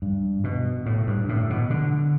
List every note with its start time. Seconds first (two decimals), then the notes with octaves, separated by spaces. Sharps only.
0.02 G2
0.44 B2
0.86 A2
1.07 G2
1.29 A2
1.50 B2
1.70 D3